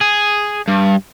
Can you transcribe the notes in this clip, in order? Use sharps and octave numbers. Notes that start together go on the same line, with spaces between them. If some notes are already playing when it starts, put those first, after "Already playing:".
G#4
G2